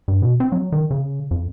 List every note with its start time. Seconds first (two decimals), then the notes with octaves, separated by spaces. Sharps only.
0.08 G2
0.22 B2
0.40 C4
0.52 F#3
0.72 D#3
0.91 C#3
1.31 F2